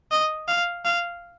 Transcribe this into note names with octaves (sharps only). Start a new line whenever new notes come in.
D#5
F5
F5